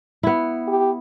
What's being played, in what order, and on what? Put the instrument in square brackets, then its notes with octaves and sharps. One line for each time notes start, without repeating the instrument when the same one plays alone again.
[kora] B3 E4
[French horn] G4